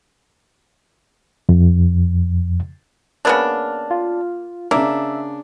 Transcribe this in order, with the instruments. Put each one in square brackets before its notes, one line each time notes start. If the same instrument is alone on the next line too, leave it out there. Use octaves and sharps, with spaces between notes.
[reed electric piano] F2
[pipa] C#3 B3 D4 [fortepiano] A#3 F6
[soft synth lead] F4
[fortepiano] C#3 D4 [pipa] A#3 [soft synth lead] E5